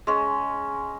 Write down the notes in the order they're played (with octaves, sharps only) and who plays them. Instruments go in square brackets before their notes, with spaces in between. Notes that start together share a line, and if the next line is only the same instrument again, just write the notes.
[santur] G#3 C#4